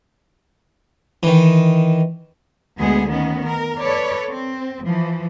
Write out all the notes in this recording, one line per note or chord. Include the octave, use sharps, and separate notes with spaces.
D#3 E3
D2 G#3 B3 G#4
D#3 B3 C#4
A#4
A4 B4 C#5 D5
C4
E3 F3